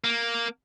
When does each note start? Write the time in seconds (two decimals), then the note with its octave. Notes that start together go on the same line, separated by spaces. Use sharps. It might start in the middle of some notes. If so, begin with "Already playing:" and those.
0.04 A#3